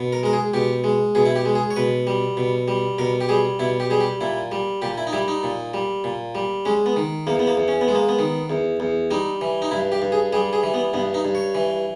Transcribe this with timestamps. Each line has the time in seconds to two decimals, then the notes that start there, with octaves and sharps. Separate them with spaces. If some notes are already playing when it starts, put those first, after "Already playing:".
Already playing: B2
0.13 A#4
0.23 G#3 A#4
0.33 G#4
0.54 B2 G4
0.84 G#3
1.15 B2 G#4
1.25 E4
1.36 G4
1.45 G#3
1.55 G#4
1.71 C#5
1.76 B2 B4
2.07 G3
2.37 B2
2.68 G3
2.99 B2 A#4
3.21 G4
3.29 G3 G#4
3.59 B2 E4
3.80 G4
3.90 G3 G#4
4.00 G4
4.21 A#2 E4
4.52 G3
4.82 A#2 G4
4.98 E4
5.07 D#4
5.13 G3 E4
5.28 D#4
5.43 A#2
5.74 G3
6.04 A#2
6.35 G3
6.65 G#3 C#4
6.86 B3
6.96 D#3
7.27 E2 A#3
7.39 B3
7.47 A#3
7.57 E2
7.68 C#4
7.81 B3
7.88 G#3
7.95 A#3
8.09 B3
8.19 D#3
8.50 E2
8.80 E2
9.11 G3 D#4
9.41 E3
9.62 D#4
9.71 G2 E4
9.92 G4
10.02 G2
10.12 G#4
10.33 G3 G#4
10.53 G#4
10.63 E3
10.74 B3
10.93 G2 B3
11.14 D#4
11.25 G2
11.35 C#5
11.55 E3